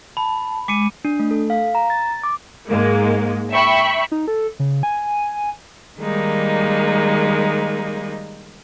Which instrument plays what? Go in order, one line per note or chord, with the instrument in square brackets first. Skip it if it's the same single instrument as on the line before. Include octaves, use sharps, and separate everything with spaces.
[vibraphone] A5 [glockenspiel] B5
[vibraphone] G#3 [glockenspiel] D6 C#7 D#7
[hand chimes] D4
A3
A4
F5
A#5
A6
D6
[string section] G#2 G#3 A#3
E5 G5 B5 C#6
[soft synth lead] D#4
A4
C#3
G#5
[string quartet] D#3 G3 G#3 A#3 D#4